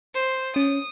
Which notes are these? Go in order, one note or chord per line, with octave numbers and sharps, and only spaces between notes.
C5
C#4 D#6